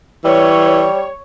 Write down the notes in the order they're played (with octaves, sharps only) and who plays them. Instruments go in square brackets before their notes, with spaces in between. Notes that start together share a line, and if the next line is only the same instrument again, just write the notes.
[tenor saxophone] E3 [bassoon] G3 [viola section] C#5